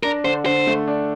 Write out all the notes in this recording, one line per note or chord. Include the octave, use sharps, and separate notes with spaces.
D4 A#4
D3 C5
D3 C5
A3
D4